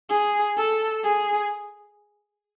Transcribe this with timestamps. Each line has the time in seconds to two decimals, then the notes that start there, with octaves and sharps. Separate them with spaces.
0.10 G#4
0.57 A4
1.04 G#4